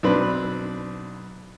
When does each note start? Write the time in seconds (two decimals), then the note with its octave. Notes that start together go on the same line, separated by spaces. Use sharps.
0.03 B1 C4 D4 B4 B5